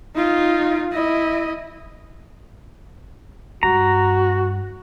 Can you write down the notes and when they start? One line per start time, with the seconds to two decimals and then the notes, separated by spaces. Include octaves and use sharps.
0.15 D#4 F4
0.92 E4 D#5
3.63 G2 F#4 A#5